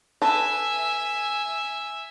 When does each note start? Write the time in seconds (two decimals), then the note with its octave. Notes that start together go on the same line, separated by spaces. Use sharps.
0.22 A4 B4 E5 G#5